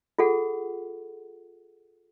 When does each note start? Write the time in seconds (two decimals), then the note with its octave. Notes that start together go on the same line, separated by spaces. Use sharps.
0.19 F4 G#4 A4 F#5